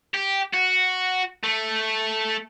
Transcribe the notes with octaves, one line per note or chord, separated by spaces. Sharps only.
G4
F#4
A3